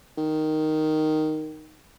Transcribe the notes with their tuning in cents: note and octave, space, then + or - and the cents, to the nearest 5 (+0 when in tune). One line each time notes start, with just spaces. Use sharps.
D#3 +0